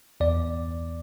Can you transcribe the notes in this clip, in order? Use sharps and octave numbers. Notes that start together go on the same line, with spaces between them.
E2 D5